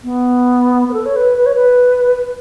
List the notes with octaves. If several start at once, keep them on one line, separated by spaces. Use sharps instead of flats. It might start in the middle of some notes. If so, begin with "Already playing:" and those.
B3
B4
A4
C#5
B4
B4
C#5
B4